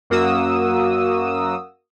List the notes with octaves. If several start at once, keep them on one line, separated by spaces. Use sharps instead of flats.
F#2 A#3 F#4 D#6 E6